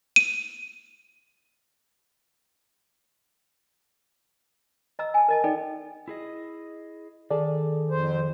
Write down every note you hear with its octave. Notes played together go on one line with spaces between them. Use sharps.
D#7
D#5 A#5 E6
G#5 A5
A#4 D#5 A5
D#4 A4 D5 G5
E4 G#4 D#5
D#3 G#4 A4 D5
F2 C5